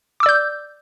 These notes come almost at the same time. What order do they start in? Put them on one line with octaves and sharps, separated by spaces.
D6 E6 D5 G6